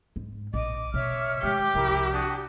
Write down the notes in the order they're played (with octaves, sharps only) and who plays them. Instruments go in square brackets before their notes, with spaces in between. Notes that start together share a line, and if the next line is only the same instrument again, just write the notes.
[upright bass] G#2
[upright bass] A#1 [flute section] D#5 [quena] D6
[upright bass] B2 [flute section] C#5 E5 F6
[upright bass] D#3 G#3 [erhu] G4 [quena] D6
[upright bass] C2 F3 [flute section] E4 A#4
[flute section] D4 F#4 D#6